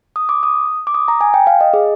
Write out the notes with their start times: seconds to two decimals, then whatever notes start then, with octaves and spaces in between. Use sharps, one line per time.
0.16 D#6
0.29 D6
0.43 D#6
0.87 D6
0.94 D#6
1.08 A#5
1.21 G#5
1.34 G5
1.47 F5
1.61 D#5
1.73 G#4